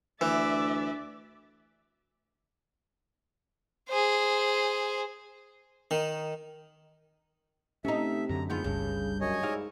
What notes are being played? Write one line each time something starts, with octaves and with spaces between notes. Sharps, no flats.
D2 E3 D5 E5
G#4 C5
D#3
C3 A3 C#4 D#4 E5
F#2 D3 A#5
F2 G#2 B3 F4 G6
G1 C#2 G2 C#3
F#2 C#5 D#5 G#5
G#2 G3 E4 F5